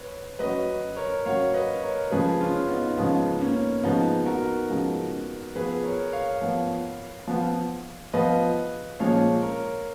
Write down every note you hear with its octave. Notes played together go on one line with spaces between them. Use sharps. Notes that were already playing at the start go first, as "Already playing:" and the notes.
Already playing: B4 C#5
F#3 C#4 F#4 B4 D#5
A#4 C#5
F#3 C#4 F#4 C#5 F5
B4 D#5
A#4 C#5
C#3 F3 G#3 G#4 B4
C#4 F4
B3 D#4
C#3 F3 G#3 B3
A#3 C#4
C#3 F3 G#3 B3 D#4
F#4 A#4
C#3 F3 G#3
F3 B3 F4 G#4 B4
A#4 C#5
C#5 F5
F3 B3 F4
F3 B3 F4
F3 B3 F4 B4 D#5
A#2 F3 G#3 C#4 C#5 F5
A#4 C#5